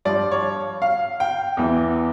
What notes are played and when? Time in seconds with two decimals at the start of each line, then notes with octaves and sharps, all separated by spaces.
0.05 G2 F3 D5
0.31 C#5
0.82 F5
1.20 G5
1.57 E2 E3